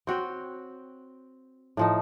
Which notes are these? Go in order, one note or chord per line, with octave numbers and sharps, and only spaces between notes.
C4 F#4 C#5 G5
A2 F3 D#4